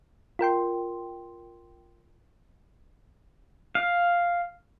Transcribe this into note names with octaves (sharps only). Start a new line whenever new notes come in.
F4 A#4 G5 C6
F5